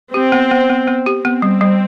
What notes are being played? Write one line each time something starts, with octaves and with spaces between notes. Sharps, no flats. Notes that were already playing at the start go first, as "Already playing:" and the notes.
C4 G4
B3
B3
B3
B3
G4
B3 C4
G3
G3